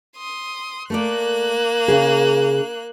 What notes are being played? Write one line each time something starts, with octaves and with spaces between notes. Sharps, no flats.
C6 D#6
A3 A#3 A#4 D5 F#6
C#3 G#4